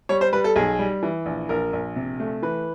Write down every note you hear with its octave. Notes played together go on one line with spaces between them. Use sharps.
G3 C#5
C5
G3 B4
A4
B1 G#4
G3
E3
A#1
A#1 A#4
A#1
C3
A3
E3 B4